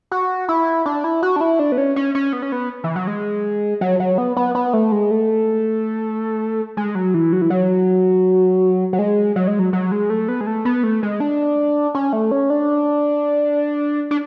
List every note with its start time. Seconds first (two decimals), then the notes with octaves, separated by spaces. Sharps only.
0.11 F#4
0.48 E4
0.86 D4
1.04 E4
1.23 F#4
1.36 D4
1.41 E4
1.59 D4
1.72 B3
1.78 C#4
1.96 C#4
2.15 C#4
2.33 B3
2.42 C#4
2.52 B3
2.84 E3
2.96 F#3
3.07 G#3
3.81 F#3
4.00 F#3
4.18 B3
4.37 B3
4.55 B3
4.73 A3
4.92 G#3
5.11 A3
6.77 G#3
6.95 F#3
7.14 E3
7.33 F#3
7.42 E3
7.50 F#3
8.93 F#3
8.99 G#3
9.36 F#3
9.48 G#3
9.59 F#3
9.73 F#3
9.92 G#3
10.10 A3
10.28 B3
10.41 G#3
10.47 A3
10.65 B3
10.83 A3
11.03 G#3
11.20 D4
11.95 C#4
12.13 A3
12.31 C#4
12.50 D4
14.11 D4